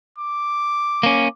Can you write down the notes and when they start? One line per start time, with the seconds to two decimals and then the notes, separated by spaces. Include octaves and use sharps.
0.18 D6
1.03 A#3 C#4